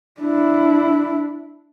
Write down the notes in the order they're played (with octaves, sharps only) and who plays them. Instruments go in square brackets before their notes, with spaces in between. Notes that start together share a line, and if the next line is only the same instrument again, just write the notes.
[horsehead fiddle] D4 E4